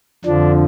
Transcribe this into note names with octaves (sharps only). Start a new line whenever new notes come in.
F2 D3 F3 D4